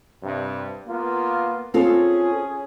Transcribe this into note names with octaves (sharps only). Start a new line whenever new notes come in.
G2 C3
A#3 B3 F4
C4 C#4 F4 G#4 A4